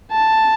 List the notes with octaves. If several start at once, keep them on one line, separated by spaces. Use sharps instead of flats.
A5